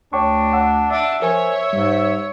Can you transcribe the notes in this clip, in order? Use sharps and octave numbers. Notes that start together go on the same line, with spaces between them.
D2 D4 C#5 G5 C#6
F#5 D6 E6
D4 E5
F3 A#4 C5 C#5 G#5
G#2 G3